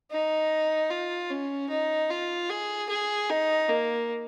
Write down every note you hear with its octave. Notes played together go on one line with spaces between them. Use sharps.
D#4
F4
C#4
D#4
F4
G#4
G#4
D#4
A#3